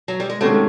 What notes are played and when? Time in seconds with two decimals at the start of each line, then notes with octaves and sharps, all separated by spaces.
0.08 F#3
0.20 G3
0.30 G#3
0.41 C3 D#3 G#3 A3 C#4 F#4